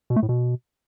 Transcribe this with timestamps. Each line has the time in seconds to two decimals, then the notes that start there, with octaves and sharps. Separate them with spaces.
0.10 B2
0.16 A3
0.23 A2
0.29 B2